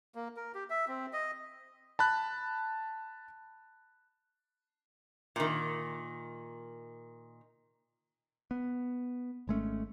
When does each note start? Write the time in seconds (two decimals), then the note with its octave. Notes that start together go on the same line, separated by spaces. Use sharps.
0.15 A#3
0.36 A#4
0.55 G4
0.70 E5
0.88 C4
1.13 D#5
1.99 A5 B5 F#6
5.36 A#2 D#3
8.51 B3
9.47 G#1 G#3 A3 C#4